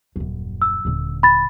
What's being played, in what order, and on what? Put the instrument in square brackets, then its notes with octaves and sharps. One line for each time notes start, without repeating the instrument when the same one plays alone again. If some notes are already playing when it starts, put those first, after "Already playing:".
[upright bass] D#1 F#2
[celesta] E6
[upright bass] D#1 D3
[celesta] B5 A6